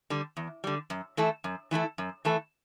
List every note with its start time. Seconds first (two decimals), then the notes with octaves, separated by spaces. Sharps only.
0.10 D3 G3
0.37 E2
0.64 D3 G3
0.90 F#2
1.17 E3 A3 E4 A4
1.44 F#2
1.71 E3 A3 E4 A4
1.98 F#2
2.25 E3 A3 E4 A4